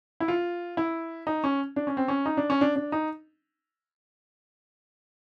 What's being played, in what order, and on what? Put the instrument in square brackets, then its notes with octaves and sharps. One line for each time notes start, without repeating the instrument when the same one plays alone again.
[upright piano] E4
F4
E4
D#4
C#4
D4
C#4
C4
C#4
D#4
D4
C#4
D4
D4
D#4